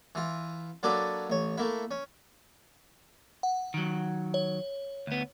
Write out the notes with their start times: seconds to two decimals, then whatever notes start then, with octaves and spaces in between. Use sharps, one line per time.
0.15 E3 F4
0.83 F#3 A#3 D4 A4 B4 D5
1.30 A1 C#5
1.58 A3 A#3 E4
1.91 C#4
3.43 F#5
3.74 D#3 F#3
4.34 C#5
5.07 D2 B3